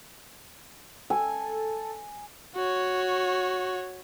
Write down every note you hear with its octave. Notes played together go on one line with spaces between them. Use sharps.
A4 G#5
F#4 C#5